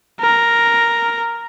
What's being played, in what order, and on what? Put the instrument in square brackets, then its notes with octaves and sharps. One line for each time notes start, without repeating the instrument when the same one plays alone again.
[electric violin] A#4